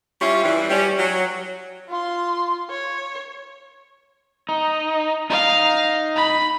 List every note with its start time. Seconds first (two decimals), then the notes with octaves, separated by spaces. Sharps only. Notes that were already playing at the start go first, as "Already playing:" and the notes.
0.21 G3 C#4 E4 F4
0.43 G2 E3
0.70 G3 C#4
0.98 F#3
1.88 F4 C6
2.69 C#5
4.49 D#4
5.30 D#4 F5
6.16 B5